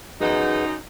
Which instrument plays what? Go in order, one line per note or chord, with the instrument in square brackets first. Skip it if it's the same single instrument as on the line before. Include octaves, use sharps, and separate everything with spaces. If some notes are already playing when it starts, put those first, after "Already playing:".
[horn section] F#2 D#4 [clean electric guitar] G#4 B4 F#5